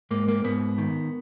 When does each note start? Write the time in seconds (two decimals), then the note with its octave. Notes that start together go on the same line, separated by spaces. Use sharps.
0.11 G#2 A#3
0.28 A#3
0.44 G#2 B3
0.78 D#3